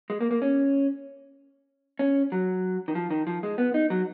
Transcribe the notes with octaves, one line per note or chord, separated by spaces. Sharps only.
G#3
A#3
A#3
C#4
C#4
F#3
D#3
F3
D#3
F3
G#3
B3
D#4
F#3